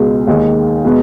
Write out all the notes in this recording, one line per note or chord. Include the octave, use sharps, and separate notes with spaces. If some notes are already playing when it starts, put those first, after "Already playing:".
Already playing: C#2 B2 G#3
D#2 D#3 G#3
B2 G#3 B3